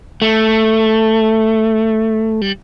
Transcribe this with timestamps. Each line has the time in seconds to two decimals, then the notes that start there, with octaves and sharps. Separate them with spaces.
0.22 A3
2.41 G3